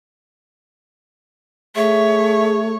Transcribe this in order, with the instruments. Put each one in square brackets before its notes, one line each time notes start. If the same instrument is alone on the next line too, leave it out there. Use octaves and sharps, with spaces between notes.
[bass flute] A3 [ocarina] G#4 [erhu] C#5 [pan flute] E5